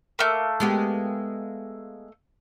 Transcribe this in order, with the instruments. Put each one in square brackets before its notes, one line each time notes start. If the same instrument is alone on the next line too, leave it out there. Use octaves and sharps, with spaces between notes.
[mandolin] A3 A#3
[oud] G#3 B3 G4